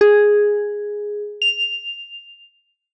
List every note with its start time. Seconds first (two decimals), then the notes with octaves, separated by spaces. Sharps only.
0.01 G#4
1.42 F7